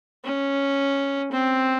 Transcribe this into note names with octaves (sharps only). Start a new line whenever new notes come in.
C#4
C4